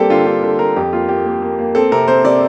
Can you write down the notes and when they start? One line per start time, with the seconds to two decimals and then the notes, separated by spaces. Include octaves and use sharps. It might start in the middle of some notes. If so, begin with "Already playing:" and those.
Already playing: G3 A#3 C4 G4 A4
0.10 D3 F4
0.26 D3 G4
0.43 D3 A4
0.59 A#3 A#4
0.76 F2 G4
0.93 A#3 F4
1.09 A#3 G4
1.26 A#3
1.42 A#3
1.59 A#3
1.75 C4 A4
1.92 C3 A#4
2.08 C4 C5
2.25 C3 D5